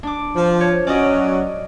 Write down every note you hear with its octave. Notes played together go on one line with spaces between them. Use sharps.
D4 D6
F3
C#5
F#3 C#4 D5 D#5